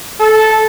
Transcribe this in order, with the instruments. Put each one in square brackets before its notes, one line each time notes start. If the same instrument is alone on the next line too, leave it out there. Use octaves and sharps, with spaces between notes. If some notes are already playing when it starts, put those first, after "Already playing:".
[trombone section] A4